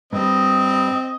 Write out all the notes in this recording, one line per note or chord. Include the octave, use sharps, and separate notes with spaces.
G2 G3 C4 D#5